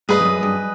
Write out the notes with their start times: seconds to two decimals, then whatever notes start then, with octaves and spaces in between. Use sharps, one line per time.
0.09 G2 G#4 B4 D#5
0.20 F2
0.25 F#2
0.43 G2